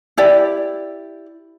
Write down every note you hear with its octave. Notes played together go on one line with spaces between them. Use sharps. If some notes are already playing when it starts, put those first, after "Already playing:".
E4 G4 D5